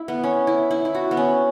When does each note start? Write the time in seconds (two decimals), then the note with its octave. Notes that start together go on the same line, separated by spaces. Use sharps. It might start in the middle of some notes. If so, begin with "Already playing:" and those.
Already playing: E4
0.08 B3
0.24 C#4
0.47 E4
0.71 E4
0.85 E4
0.94 F#4
1.11 B3
1.17 C#4